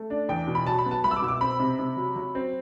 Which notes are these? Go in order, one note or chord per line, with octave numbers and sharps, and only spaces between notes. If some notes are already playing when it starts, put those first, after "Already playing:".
Already playing: A3
D4
E2 G5
B2
B5
F#3 A5
B5
B3
A5
C2 B5
E6
D6
B2 E6
D6
C4 B5
C3
C3
F#3
F#3
C4